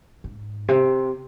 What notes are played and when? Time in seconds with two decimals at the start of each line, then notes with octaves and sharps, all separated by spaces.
0.24 G#2
0.68 C3